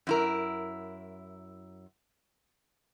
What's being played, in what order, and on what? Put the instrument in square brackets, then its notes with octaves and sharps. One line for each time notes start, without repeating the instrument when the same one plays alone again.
[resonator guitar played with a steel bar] F#2 E4 A#4